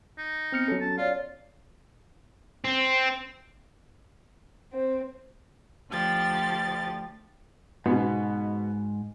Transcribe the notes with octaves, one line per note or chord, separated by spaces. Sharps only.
D#4
B3 C4 F6 C#7
F#3 C#4 A4
A5
F4 C#5 D5 F5
C4
C4
D2 F3 G4 A6
G#2 B2 B3